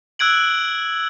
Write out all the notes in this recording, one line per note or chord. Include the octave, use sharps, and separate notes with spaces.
E6 F#6 G#6 D7 F#7